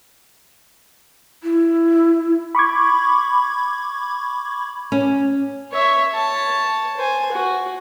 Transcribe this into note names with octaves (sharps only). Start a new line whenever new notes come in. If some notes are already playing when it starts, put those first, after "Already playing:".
E4
B5 C#6 D6 G#6
C#4
C#5 E5
C#5 A5
C5 G#5
F#4